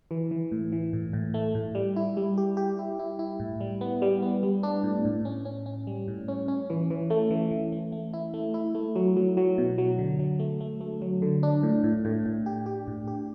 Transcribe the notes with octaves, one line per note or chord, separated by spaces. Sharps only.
E3
E3
A2
E3
A2
A2
A3
A2
G3
E4
G3
G4
G4
E4
E4
E4
A2
G3
B3
G3
B3
G3
D4
A2
A2
C#4
C#4
C#4
G3
A2
C#4
C#4
E3
E3
A3
E3
E3
A3
A3
E4
A3
E4
A3
F#3
F#3
F#3
B2
F#3
D3
F#3
A3
A3
A3
F#3
D3
D4
A2
A2
A2
A2
G4
G4
A2
G4